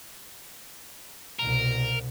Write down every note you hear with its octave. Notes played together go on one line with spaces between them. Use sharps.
C2 B2 A#4